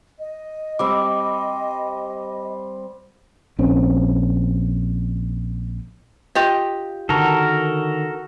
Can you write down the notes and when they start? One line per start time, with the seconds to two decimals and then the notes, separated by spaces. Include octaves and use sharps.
0.17 D#5
0.79 G3 C4 D6
3.59 A#1 C4 C#4
6.35 F4 G4 D#5
7.09 D3 D#3 F#4 A4 A#4